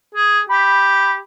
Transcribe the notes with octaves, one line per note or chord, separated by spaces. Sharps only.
G#4
G4 B5